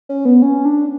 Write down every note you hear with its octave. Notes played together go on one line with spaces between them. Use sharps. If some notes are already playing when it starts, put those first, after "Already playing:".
C#4
B3
C#4
D4